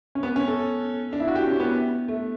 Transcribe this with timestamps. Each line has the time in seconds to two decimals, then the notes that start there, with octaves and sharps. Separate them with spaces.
0.15 C#4
0.23 B3
0.36 C#4
0.48 A4
1.13 D4
1.20 E4
1.28 F#4
1.35 G4
1.47 C#4
1.60 B3
2.08 A3